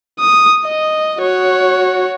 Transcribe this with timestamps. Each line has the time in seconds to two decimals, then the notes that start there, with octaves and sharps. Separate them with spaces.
0.20 D#6
0.66 D#5
1.20 F#4 C#5